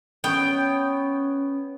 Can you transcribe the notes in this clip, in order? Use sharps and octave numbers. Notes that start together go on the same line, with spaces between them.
B3 C#4 C#5 G5